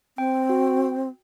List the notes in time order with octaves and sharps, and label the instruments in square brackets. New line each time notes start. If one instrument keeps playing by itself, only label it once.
[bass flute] C4 [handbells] G5
[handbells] F#4